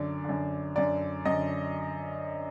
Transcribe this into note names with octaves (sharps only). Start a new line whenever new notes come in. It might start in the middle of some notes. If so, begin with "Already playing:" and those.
Already playing: F#2 D3 D5
F#2 D3
F#2 D3 D5
F#2 D3 D#5